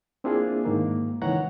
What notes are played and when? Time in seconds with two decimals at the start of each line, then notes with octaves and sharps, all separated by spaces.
0.24 A#3 C4 D4 E4 F4 G#4
0.65 G#2 D#3 A#3
1.22 C#2 D#3 E3 C#5 F#5 A#5